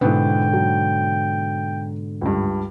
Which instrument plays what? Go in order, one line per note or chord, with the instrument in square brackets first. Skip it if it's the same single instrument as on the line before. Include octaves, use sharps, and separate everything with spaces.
[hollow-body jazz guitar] G#2 B2 D3 [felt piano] B3 E4 [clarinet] G5
[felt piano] F#3
C#2 G2